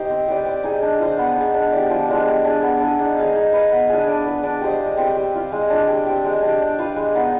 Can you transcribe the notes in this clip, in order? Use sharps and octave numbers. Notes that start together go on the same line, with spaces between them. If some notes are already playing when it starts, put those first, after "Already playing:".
Already playing: D#4 G4 C5
C4
G4 B4 D5
C4
D#4 G#4
D4
F4 C5
B3
D#4 G#4
D4
G4 D5
F3
G#3 D4 F4
G3
D4 G#4
B3
D4 G#4
D#4
G#4 C5 F5
D#4
B4 F5
B3
D4 F4 G#4
D4
G#4 B4
D4
G4 C5 D#5
G#3
C4 G4 B4
G3
C4 F4
G#3
D4 F4 G#4
G3
C4 G4
G#3
D4 G4
D4
F4 B4 F5
G#3
B3 D#4